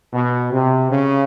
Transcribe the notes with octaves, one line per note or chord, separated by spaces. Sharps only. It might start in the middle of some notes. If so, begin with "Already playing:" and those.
B2
C3
C#3